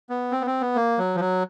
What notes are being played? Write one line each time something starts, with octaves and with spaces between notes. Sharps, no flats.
B3
C4
B3
C4
B3
A#3
F#3
F3
F#3